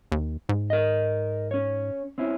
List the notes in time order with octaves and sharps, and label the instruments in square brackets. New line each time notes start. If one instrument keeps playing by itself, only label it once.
[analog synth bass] D#2
G#2
[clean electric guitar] A#4 D#5
C#4 C#5
C4 C#4 E4